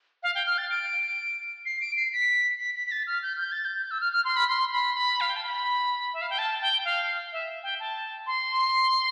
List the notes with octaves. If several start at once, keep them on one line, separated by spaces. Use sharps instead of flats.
F5
G5
F6
A6
D7
C7
D7
C7
B6
B6
B6
B6
A6
F6
G6
G6
A6
G6
E6
F6
F6
C6
B5
C6
B5
C6
B5
F5
G5
A5
B5
E5
F5
G5
A5
G5
F5
E5
G5
A5
C6